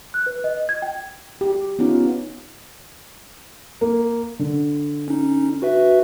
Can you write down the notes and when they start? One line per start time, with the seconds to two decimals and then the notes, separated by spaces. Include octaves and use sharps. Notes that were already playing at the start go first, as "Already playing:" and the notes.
0.14 F#6
0.26 B4
0.44 D#5
0.69 G#6
0.82 G5
1.41 G4
1.79 B3 C#4 D#4 F4
3.81 A#3
4.39 D3
5.08 C#4 D#4
5.62 F#4 B4 E5